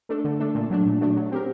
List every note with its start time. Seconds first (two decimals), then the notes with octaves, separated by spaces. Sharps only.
0.09 A3 D4 A4
0.24 D3
0.40 A3 D4 A4
0.55 A#2
0.70 F#3 A3 D4
0.86 A#2
1.00 F#3 A3 D4
1.16 F#3
1.32 C4 G4 A#4